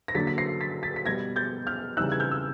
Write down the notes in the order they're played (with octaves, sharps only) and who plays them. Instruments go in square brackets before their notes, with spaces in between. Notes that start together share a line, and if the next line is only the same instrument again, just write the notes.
[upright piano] A#6
D3 F#3 A#3 D4 A6 B6
B6
A#6 C7
A6 B6
A6 B6
B6
B2 G3 B3 G#6 A#6
G6 A6
F6 G6
C#3 E3 G3 C4 D#4 E6 F#6
G#6
F6 G6
E6